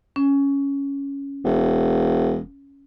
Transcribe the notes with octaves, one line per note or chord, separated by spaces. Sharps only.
C#4
E1